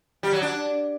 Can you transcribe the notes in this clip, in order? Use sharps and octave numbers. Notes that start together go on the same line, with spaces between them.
G3
F#3
D4